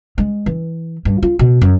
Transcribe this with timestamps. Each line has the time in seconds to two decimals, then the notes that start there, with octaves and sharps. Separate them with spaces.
0.18 G#3
0.46 E3
1.05 G2
1.23 F4
1.39 B2
1.62 F#2